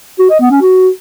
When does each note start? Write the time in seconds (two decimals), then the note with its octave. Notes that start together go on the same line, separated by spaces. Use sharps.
0.19 F#4
0.30 D#5
0.40 B3
0.51 C#4
0.61 F#4